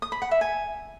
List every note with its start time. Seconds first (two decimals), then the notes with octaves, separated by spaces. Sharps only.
0.02 D#6
0.12 B5
0.22 F#5
0.31 E5
0.41 G#5